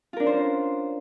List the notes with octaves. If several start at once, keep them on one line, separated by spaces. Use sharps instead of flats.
C#4 D4 F4 A#4 C5